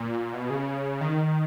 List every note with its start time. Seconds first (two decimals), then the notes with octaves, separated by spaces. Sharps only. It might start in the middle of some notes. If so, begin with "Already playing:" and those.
Already playing: A#2
0.33 B2
0.50 C#3
1.01 D#3